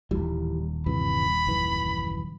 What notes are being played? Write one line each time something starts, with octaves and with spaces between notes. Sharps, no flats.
D#1 D#2 A2 E3 G3
G2 C3 E3 B5
F#1 F#2 E3